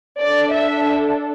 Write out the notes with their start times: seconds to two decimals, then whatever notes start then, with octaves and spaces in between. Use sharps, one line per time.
0.21 D4 A4 D5
0.53 E5